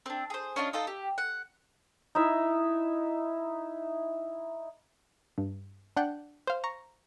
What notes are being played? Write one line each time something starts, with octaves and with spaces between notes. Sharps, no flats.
C4 D4
G#4 C5
C#4 D4 F4 D#5
D#4 F4 A4 D#5
G4
F#5
D#4 E4 E5
G2
D4 F#5 G5
C5 F5
A#5 C#6